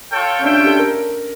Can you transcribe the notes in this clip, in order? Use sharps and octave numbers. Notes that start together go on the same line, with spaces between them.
F4 A4 C#5 G5
C#4
D4 F4 C#5 E5 G5
G4
A4
A#4